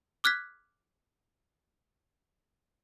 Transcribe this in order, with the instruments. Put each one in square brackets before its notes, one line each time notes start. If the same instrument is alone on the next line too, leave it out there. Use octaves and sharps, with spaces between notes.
[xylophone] D6 F6 F#6 G#6 B6